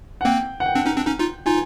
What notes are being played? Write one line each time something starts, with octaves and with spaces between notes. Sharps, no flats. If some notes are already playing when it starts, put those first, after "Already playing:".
F#5
A#3 C4 G5
F#5
G5
C4 D4
C#4 D#4
C4 D4
C#4 D#4
D#4 F4
D#4 F4 G#5